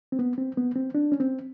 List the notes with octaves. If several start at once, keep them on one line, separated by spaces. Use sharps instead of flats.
C4
B3
C4
B3
C4
D4
C#4
C4